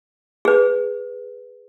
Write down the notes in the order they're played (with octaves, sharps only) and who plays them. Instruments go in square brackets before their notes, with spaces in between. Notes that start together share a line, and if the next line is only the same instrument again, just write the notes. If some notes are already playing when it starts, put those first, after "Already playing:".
[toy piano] G#4 B4